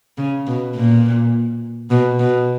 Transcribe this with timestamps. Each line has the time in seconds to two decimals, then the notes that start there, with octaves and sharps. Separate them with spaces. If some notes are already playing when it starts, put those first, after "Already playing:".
0.18 C#3
0.47 B2
0.76 A#2
1.90 B2
2.19 B2